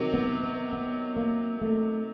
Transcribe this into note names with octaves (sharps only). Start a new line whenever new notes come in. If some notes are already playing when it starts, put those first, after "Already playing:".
Already playing: C3 D#3 F#3
B3
B3
B3
A#3
A3